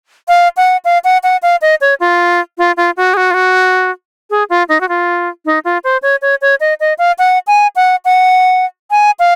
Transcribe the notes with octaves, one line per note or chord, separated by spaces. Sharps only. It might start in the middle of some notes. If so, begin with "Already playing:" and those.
F5
F#5
F5
F#5
F#5
F5
D#5
C#5
F4
F4
F4
F#4
G#4
F#4
F4
F#4
G#4
F4
D#4
F#4
F4
D#4
F4
C5
C#5
C#5
C#5
D#5
D#5
F5
F#5
G#5
F#5
F#5
G#5
F5